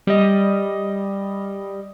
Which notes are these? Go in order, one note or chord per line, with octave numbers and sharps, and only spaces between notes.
G3 D#5